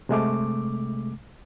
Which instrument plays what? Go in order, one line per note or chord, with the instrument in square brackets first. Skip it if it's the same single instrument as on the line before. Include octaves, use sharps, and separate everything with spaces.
[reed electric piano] C3 G#3 A3 D6